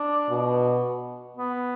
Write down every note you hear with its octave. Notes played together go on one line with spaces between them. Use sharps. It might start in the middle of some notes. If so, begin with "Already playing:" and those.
Already playing: D4
B2
B3